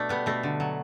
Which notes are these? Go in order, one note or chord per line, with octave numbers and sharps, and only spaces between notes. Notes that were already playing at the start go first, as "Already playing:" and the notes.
Already playing: B2 A3 D4
G3 B3
B2 A3
D3
F#3